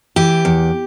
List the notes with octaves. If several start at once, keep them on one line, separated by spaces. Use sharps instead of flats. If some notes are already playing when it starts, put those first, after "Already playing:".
E3 G4
E2